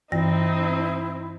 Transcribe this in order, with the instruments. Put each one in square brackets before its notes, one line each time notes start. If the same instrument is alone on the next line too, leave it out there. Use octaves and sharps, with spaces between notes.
[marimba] G2 E3 A#6 [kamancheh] C4 D#4 [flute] E4